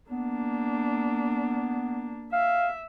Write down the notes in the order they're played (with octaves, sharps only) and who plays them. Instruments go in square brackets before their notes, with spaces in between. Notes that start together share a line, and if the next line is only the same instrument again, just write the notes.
[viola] A#3 D4 [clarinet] B3
[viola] E5 [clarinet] F5